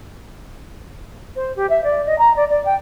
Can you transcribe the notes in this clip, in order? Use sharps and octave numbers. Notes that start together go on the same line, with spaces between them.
C5
G4
E5
D5
D#5
A#5
D5
D5
G5